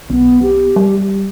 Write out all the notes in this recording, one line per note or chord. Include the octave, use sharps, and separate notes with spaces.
B1 B3
G4
G3